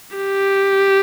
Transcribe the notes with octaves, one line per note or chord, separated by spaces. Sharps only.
G4